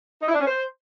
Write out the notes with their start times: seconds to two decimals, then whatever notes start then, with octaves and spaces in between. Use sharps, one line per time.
0.22 D#4
0.28 E4
0.34 D4
0.41 C#4
0.47 C5